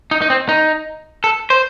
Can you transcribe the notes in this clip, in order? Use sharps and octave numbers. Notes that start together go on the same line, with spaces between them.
D#4
D#4
C4
D#4
A4
C5